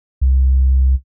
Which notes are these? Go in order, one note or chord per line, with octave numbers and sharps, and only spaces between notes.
C2